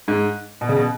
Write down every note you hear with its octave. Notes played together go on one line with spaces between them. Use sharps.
G#2
B2
C#3
B2